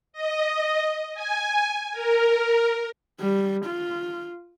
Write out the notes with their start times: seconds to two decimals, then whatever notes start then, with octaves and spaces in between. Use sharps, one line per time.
0.13 D#5
1.14 G#5
1.93 A#4
3.20 G3
3.65 F4